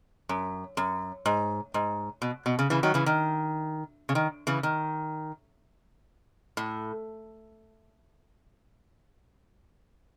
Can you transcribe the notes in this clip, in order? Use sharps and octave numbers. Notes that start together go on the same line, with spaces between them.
F#2
F#2
G#2
G#2
B2
B2
C#3
C#3 E3
D#3 F#3
C#3 E3
D#3
C#3
D#3
C#3 E3
D#3
A2